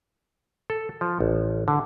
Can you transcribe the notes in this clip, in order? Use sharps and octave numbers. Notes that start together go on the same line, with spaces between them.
A4
F3
A1
D3